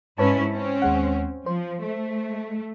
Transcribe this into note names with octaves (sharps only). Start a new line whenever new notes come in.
G#2 C#4 E4 B4 C#5 A5
C4 C#4
D#2 G#3 F#5
F3 C5
A3